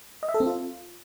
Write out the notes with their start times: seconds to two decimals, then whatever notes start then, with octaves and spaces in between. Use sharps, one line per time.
0.23 D#5
0.29 E5
0.34 A4
0.40 C4
0.46 F4